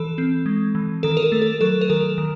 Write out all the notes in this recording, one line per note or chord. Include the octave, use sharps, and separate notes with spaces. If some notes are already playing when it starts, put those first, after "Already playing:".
Already playing: E3 A4
C4
G#3
E3
D#3 A4
A#4
A4
A3
A4
F#3 A4
A#4
D#3 A4
D#3